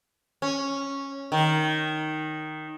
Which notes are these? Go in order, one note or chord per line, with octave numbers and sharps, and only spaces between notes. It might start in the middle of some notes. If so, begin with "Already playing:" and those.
C#4
D#3